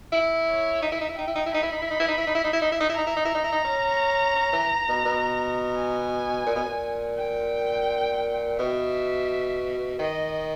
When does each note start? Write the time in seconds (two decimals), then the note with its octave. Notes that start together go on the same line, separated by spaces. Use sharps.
0.12 E4
0.47 C#5
0.82 D#4 E5
0.92 E4
1.01 D#4
1.09 E4
1.18 D#4 G5
1.27 E4
1.36 D#4
1.46 E4
1.52 D#4 B5
1.63 E4
1.72 D#4
1.82 E4
1.91 D#4
2.00 E4
2.08 D#4
2.18 E4
2.27 D#4
2.35 E4
2.44 D#4
2.53 E4
2.62 D#4
2.72 E4
2.81 D#4
2.89 E4
2.94 D#4 A#5
3.07 E4
3.17 D#4
3.25 E4
3.35 D#4
3.44 E4
3.52 D#4
3.65 C#4
4.36 C#4
4.53 E3
4.88 B2
5.06 B2
5.77 G#5
6.47 A#2
6.55 B2
6.65 A#2
7.17 G5
8.59 B2 E5
9.99 D#3 D#5